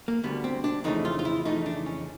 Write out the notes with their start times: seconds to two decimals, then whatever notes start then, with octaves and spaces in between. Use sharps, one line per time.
0.08 A#3
0.24 D2 D3 G3 B3
0.44 C4
0.64 D4
0.84 F2 C#3 E3 A3 D#4
1.05 F4
1.19 F4
1.25 E4
1.45 F2 C#3 E3 A3 D#4
1.66 D4
1.86 C#4